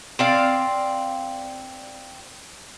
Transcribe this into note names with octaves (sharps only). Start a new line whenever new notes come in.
C4 D5 F5